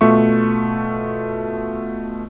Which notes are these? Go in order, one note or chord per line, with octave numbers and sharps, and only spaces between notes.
B2 A3 F4 E5 C#6